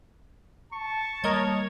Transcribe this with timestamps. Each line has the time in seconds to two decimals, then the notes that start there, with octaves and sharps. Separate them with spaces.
0.72 A5 C#6
1.24 G3 A#3 A#4 C#5 D#5 G#6